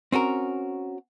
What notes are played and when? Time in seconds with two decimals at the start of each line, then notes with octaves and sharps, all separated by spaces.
0.12 C4 C#4 F#4 A#4